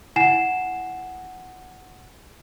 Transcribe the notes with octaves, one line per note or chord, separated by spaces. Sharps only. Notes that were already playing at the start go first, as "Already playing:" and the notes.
E4 F#5 G#5 C7 E7